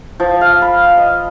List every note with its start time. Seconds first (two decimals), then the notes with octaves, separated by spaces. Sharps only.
0.20 F3
0.41 F5
0.62 B5
0.97 D#5